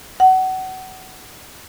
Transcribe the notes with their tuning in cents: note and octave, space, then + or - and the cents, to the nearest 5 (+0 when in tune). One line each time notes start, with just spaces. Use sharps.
F#5 +25